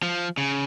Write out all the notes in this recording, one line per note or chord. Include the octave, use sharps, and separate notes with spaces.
F3
C#3